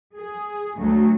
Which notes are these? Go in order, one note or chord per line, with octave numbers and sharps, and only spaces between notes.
G#4
D2 F#3 A3